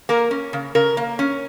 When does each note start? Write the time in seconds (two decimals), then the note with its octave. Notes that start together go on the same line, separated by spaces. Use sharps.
0.09 A#3 A#4
0.31 C#4
0.53 C#3
0.75 C#3 A#4
0.97 A#3
1.19 C#4